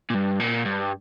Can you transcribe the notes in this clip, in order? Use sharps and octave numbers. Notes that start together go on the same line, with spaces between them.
A#2
G2
A#2
G2